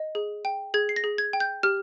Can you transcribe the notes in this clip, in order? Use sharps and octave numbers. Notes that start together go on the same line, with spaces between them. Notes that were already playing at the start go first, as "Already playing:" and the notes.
Already playing: D#5
G#4
G5
G#4 G#6
C7
A#6
G#4
G#6
G5
G6
G4 F6